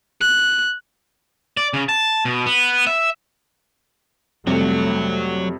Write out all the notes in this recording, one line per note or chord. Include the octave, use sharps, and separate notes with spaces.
F#6
D5
C#3
A5
B2
B3
E5
F2 C3 F#3 G3 A3